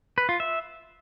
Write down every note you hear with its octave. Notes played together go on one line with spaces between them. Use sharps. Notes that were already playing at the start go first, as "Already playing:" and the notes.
B4
F4
E5